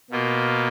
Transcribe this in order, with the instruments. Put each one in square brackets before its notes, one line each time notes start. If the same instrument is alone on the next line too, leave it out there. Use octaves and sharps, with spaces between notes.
[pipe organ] B2 A#3 F4